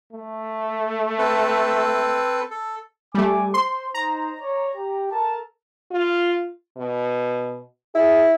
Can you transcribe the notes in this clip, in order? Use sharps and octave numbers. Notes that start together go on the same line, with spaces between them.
A3
C4 A4 B4
A4
G3 A3 G#5 D6
C5 C6
D#4 C5 A#5
C#5 D5
G4
A4 A#4 A5
F4
B2
E4 G#4